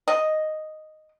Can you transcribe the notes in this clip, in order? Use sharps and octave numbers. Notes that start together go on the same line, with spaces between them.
D#5